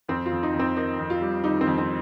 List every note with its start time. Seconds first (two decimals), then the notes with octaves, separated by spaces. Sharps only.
0.09 F2 C4
0.26 F4
0.31 F2
0.43 D#4
0.54 F2
0.59 C4
0.76 D#3 D#4
0.99 F2
1.10 F4
1.21 G3
1.44 G3 D#4
1.61 C4
1.67 F2
1.78 C4